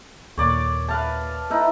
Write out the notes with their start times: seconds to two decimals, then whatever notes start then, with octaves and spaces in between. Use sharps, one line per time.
0.38 D#2 A#2 C#5 D5
0.88 B4 F5 A5
1.50 D#4 E4 B4